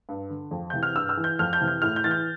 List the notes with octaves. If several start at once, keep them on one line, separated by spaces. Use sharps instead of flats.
G2
D3
F2
C3 E3 G6
F6
G2 E6
E6
E3
G6
F2 F6
G6
C3 E3
G6
A2 F6
G6
E3 A6
G6